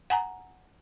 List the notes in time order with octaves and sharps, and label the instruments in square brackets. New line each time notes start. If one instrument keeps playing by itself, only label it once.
[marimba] F#5 G#5 A#5